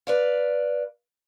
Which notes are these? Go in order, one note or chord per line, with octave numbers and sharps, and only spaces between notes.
B4 D5 F5